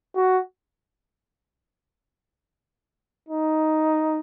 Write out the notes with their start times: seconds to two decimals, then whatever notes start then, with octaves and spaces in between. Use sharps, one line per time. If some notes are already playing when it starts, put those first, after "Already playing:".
0.16 F#4
3.29 D#4